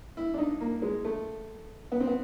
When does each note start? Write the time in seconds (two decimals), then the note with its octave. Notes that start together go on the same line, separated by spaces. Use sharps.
0.17 E4
0.34 D4
0.38 D#4
0.61 A#3
0.82 G#3
1.05 A3
1.92 B3
2.00 C4
2.07 B3